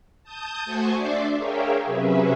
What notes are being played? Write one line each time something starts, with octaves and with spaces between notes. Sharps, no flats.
A5 D#6 G6
A3 F#4 C5 G#5 C#6
D4 D5 E5 C6 D6
G#4 A#4 C#5 E5 F5 G5
C3 F#3 C#4 G#4 B4 E5